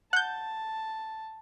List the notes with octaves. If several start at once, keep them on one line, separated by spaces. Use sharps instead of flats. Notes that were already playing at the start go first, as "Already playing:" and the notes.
F#5 A5 G6